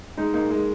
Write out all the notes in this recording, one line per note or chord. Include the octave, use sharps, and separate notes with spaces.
G#3 D#4
A#3 D#4
G#3 D#4